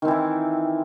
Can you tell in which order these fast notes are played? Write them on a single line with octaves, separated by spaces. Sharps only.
D#3 C4 E3 E4